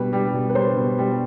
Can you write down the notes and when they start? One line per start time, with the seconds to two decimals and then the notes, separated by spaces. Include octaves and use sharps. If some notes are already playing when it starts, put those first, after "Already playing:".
Already playing: B2 G3 B4
0.13 G3
0.33 B2
0.49 B4
0.55 G3 C5
0.77 B2
0.98 G3